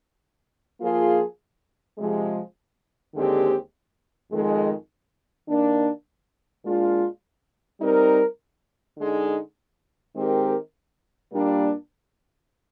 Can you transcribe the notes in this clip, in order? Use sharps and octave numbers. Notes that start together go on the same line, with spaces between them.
F3 A#3 F4 G#4
C3 F3 G#3
D#2 D3 G#3 C4 G4
F2 D#3 G#3
D#3 A#3 D4
A#2 G#3 D4 F4
G3 C4 D#4 A#4
D3 G#3 D#4
D#3 G#3 C4 G4 A#4
A#2 G3 A#3 D4